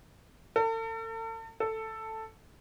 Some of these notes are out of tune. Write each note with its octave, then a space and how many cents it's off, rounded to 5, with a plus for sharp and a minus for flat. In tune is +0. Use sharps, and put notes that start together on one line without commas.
A4 +40
A4 +5